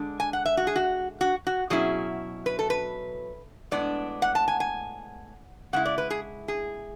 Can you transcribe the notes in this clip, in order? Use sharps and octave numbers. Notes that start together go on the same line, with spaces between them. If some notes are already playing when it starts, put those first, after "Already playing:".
Already playing: D3 G#3 D4
G#5
F#5
E5
F#4
G#4
F#4
F#4
F#4
B2 F#3 C#4 E4 G#4
B4
A4
B4
A2 G#3 B3 D4 D5
F#5
A5
G#5
G#5
C#3 G#3 E4 F#5
D5
B4
G#4
G#4